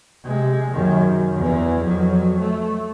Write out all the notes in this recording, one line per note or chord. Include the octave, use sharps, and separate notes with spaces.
C3 G#3
F#2 D#3
E2 E3
F2 F#3
A3